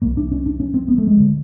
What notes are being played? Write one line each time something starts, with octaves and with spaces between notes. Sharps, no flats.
C2 C3 A#3
D4
C#4
D4
C#4
C4
B3
A3
G#3
D2 D3